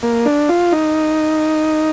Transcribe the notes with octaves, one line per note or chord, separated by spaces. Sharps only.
A#3
D4
F4
D#4